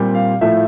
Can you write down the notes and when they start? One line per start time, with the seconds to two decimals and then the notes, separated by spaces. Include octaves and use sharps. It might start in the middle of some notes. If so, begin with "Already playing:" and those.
Already playing: A#2 G3 C4
0.15 F5
0.41 A2 F3 A3 E5